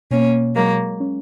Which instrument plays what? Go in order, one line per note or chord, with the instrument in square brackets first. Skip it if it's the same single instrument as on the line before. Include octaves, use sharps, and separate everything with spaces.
[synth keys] B2 [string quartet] A#3 C#4
[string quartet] F#3 A#3 [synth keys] G#3
[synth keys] C#4